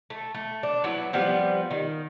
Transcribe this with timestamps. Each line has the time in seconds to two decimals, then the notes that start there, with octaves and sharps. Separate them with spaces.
0.10 A3
0.34 A3
0.63 D4
0.84 F#3 B3 E4
1.13 F3 G3 B3 C4
1.71 D#3